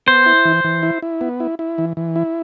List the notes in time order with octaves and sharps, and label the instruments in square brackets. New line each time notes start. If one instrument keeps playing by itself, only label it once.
[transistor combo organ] B3 [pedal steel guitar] C5
[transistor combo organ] E4
E3
E3
E4
E4
B3
E4
E4
E3
E3
E4